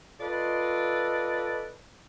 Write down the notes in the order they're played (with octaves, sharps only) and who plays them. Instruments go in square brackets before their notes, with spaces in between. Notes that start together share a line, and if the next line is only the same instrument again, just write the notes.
[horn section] F4 A4 B4 D5 D#5